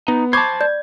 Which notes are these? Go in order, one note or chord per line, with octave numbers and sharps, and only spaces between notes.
B3 D#4
C5 A5 B5 C#6 D6 G#6
D5 G6